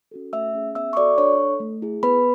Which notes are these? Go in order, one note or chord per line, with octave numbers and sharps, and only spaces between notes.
C#4 F#4 A4
A3 E5 E6
C#4 G#4
B3 E5 E6
C#6
F#4 A4 D5 D6
D4 C#5 C#6
A4
A3
E4 G#4
B3 B4 B5